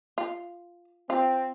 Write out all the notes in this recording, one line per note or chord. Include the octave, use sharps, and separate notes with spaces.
F4
C4 F4